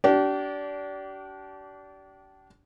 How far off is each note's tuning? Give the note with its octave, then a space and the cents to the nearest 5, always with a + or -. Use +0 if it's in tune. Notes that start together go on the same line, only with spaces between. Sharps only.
D4 -25 G4 -40